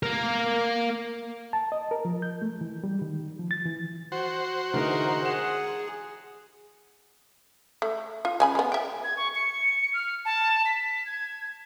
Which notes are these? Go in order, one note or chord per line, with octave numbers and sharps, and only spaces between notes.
A#3 A#4
A5
D#5
A#4
F3
G6
A3
E3
G3
D#3
F3
A6
E3
F#4 C5
D3 E3 G#3 D#4 A#4
G#4 F#5 E7
A3
F4
C#3 G#5 B5
G#3 B3
E5 G5
G#6
C#6
C#7
F6
A5
B6
G#6